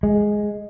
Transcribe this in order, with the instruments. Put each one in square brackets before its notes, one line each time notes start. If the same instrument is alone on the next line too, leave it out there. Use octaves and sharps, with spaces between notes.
[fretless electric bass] G#3